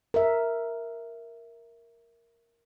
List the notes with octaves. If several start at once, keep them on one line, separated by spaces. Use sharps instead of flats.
A#4 E5